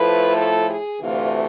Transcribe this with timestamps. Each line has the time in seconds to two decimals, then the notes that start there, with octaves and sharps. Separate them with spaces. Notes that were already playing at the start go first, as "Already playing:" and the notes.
Already playing: A2 F3 A3 B4
0.37 A4
0.69 G#4
1.01 D2 C3 E3 A3 F4